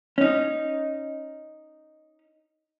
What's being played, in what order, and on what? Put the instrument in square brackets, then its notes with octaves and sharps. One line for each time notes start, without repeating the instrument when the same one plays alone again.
[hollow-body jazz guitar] C#4 D#4